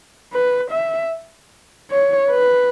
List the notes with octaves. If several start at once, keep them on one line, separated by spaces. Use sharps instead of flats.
B4
E5
C#5
B4